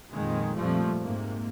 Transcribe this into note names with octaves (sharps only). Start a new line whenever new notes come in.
F2 A#2 D#3 G#3
F2 A#2 F3 G3 A3
G#2 C3 A#3